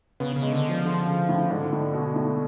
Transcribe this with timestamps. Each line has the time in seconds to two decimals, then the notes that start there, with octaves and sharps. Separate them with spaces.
0.20 C#3 B3
0.36 C#3
0.42 G#3
0.53 D3
0.69 F3
0.85 D3
1.07 C#3
1.29 A2
1.50 G#2 D3
1.72 A2
1.93 B2
2.16 A2